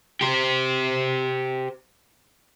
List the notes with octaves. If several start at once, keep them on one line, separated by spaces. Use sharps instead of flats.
G4 C5